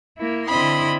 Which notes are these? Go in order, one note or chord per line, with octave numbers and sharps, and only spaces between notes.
A#3 E4
D3 C4 E4 D#5 B5 C6